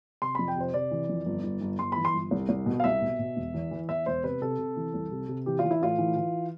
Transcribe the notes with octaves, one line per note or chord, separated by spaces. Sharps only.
C3 C6
F2 B5
G5
C3 C5
C3 D5
E3
F2
G1
G1
G1
G1 C6
E3 B5
C6
G1
C2
C2
B2
F5
C2 E5
B2
B2
E1
E2
E3
E2 E5
E1 C5
C3 B4
C3 A4
C3
E3
C2
C3
C3
E3 G4
F4
E3
E4
A2 F4
E3
E3